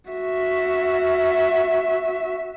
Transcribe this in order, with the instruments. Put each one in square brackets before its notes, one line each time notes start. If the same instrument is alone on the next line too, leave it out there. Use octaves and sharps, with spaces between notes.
[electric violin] F#4 E5